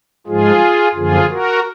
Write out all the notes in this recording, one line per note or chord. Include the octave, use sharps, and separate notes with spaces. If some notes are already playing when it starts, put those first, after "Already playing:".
G#2 F3 G#3 F4 G#4
F#2 D3 F3 A#3 F4 G#4
F#4 A#4